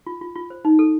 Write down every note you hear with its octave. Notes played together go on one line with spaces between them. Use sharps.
F4
F4
F4
C5
D#4
A4